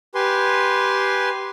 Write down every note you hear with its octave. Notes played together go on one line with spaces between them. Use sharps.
G4 B4 G#5 C6